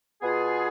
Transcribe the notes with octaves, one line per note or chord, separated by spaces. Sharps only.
B2 B3 F4 G#4